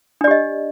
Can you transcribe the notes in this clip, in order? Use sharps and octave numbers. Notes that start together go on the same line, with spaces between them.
D4 G4 D5 D#5